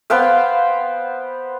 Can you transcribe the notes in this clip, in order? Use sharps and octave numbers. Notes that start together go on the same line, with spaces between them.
B3 C5 F5 G5